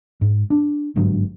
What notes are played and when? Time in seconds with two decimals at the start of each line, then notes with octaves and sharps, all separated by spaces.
0.21 G#2
0.50 D4
0.96 G1 G#2 D3 F#3